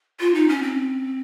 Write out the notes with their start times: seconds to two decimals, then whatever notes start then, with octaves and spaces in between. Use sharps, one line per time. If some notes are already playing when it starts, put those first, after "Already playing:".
0.20 F4
0.34 D#4
0.49 C#4
0.63 C4